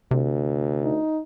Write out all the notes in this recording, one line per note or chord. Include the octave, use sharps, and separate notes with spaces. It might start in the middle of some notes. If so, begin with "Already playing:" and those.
D2 C3
D#4